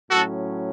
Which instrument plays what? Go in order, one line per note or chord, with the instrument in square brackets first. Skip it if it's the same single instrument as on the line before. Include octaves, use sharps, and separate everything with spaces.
[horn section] A2 F#3 C#4 F#4 A4